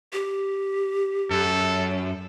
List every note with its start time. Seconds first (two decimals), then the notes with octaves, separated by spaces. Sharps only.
0.13 G4
1.31 F#2 A4